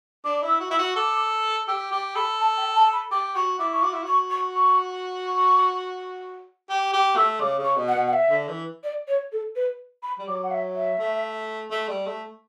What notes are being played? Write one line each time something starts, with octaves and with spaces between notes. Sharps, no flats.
D4 D6
E4
E6
F#4
E4 E6
F#4
A4 D6
G4 E6
G4 D6
A4 B5
A5
G5
A5
B5
G4 D6
F#4 C#6
E4 D6
C#6
F#4 D6
E4
F#4 C#6
C#6
C#6
C#6
G4 D6
G4 D6
A3 E6
C#3 D6
C#3
C#6
B2
F#5
B2
F#5
E5
D3
E3
D5
C#5
A4
B4
B5
G3
F#3 D6
F#5
E5
E5
A3
A3
G3
A3